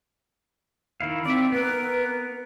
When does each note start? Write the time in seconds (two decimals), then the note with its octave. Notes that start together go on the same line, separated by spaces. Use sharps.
1.01 D#3 E4 F5
1.26 C4 D5 E5
1.52 B3 A#4 B4